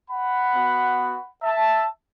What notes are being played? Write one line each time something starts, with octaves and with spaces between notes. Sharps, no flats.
F#5 B5
B3 F#4
E5 A5